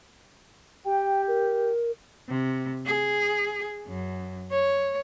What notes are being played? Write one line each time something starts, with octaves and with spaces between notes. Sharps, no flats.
G4 G5
A#4
C3
G#4
F#2
C#5